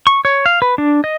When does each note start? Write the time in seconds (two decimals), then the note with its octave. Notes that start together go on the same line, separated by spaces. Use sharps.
0.07 C#6
0.25 C#5
0.46 F5
0.62 B4
0.78 D4
1.04 D#5